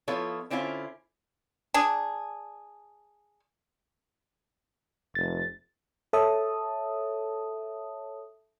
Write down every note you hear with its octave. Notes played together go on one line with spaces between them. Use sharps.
F3 B3 E4 F4 A4 C#5
D3 C4 C#4 E4 F4
D4 G#4
F1 A6
A4 C#5 E5 A5 D#6